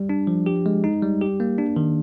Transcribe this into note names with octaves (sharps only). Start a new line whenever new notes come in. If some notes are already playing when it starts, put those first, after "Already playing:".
Already playing: G3
D4
F3
G4
G#3
D#4
G3
G4
A#3
D4
D#3